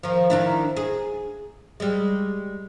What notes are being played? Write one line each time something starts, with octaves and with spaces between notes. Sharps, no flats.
D#3 F3
D#3 D4 E4
G#4
G3 G#3